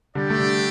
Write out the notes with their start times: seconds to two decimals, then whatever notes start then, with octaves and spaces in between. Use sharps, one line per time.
0.15 D3 G3 D4 G4 D5 G5
0.30 A3
0.39 D3 G3